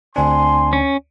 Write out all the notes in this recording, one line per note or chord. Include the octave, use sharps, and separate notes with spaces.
D2 C4 D4 G#5 C6
C#4